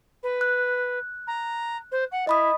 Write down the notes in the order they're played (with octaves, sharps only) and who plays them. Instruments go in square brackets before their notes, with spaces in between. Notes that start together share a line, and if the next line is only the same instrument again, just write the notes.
[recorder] B4
[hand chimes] F#6
[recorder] A#5
C5
F#5
[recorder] E4 [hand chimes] D#5 B5 D#6